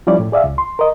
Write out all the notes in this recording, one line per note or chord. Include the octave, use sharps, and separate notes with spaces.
F3 G3 C#4 E4 D5
A2
G#4 D5 E5 F5
C#2
C6
A#4 D#5